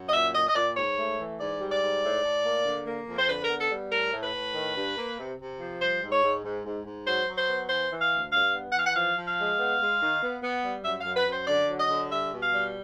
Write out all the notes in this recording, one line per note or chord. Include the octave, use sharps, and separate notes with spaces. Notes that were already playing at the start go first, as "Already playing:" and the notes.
Already playing: F#2
D#5
A#2 E5
A#2 D#5
D#5
A#2 D5
G#2 C#5
A3
E3
G#2 D5
G3
D5
G#2
A2
A2
A#3
D3
A#3
F2
C5
D3 B4
A#4
B3
A4
G3
A2 A#4
A2
B4
A2
D#3
G2
A#3
C3
C3
F3
G3 C5
G#2
C#5
G#2
G#2
G#2
G#2
F#3 C5
F#3
C5
B3
E3 C5
E3
F5
D2
G2 F5
B3
F#5
E3 F5
F#5
F3 F5
F3
F5
G#3
B3
G#3
D#3
B3
B3
G3
F#2 E5
F#2 F5
B4
F#2
C5
D3 D5
F#3
D#5
D3
G3 E5
B2
F5
G3